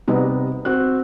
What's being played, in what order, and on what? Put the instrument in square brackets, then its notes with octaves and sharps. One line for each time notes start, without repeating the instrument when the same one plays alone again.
[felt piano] C3 [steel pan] G3 B3 D#4
[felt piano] C4 F#4 F#6